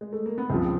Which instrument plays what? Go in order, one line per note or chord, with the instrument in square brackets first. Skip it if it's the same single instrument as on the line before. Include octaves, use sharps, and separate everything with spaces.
[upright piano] G#3
A3
A#3
B3
[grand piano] C#2 C#3 F3 [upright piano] C4